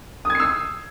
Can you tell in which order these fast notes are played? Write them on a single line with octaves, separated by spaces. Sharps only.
D#6 G#6 C7 E6